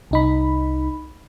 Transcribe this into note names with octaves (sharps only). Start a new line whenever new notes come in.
C2 D#4 B5